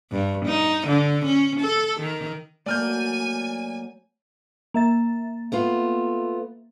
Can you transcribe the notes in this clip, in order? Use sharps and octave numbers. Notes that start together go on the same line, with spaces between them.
G2
D#4
D3
C#4
A4
D#3
F#3 A3 A#3 D5 G#5 F6 G6
A#3 E5 A6
A3 B3 F4